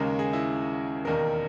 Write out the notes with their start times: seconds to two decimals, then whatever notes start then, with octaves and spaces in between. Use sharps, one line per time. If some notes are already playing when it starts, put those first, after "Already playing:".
Already playing: D#2 C#3 G#3 A#4
0.19 G#4
0.33 E4
1.05 E1 D#2 D#3 A#4